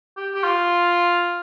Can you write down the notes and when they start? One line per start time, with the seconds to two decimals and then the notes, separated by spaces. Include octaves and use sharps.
0.17 G4
0.34 G4
0.44 F4